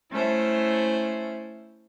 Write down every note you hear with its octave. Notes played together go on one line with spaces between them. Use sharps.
A3 C#4 E4 C5